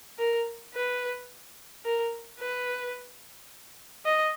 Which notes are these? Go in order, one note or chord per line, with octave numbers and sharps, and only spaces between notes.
A#4
B4
A#4
B4
D#5